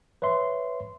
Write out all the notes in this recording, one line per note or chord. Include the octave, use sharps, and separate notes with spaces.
B4 C#5 E5 C6